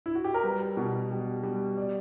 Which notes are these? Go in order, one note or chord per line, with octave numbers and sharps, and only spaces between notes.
E4
F#4
G4
A#4
G3 B4
B2
G3
G3
D5